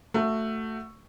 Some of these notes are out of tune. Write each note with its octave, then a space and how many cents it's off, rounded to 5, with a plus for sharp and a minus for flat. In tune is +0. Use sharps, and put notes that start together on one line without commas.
A3 +10 F#4 +0